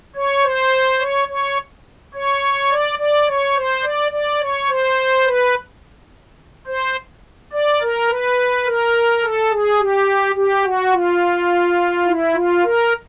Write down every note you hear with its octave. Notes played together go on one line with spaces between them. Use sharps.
C#5
C5
C#5
C#5
C#5
D5
D5
C#5
C5
D5
D5
C#5
C5
B4
C5
D5
A#4
B4
A#4
A4
G#4
G4
G4
F#4
F4
E4
F4
A#4